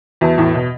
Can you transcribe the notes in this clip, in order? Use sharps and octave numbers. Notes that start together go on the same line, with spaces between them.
E2 F#4 B4 E5 A5
E2 A2
B2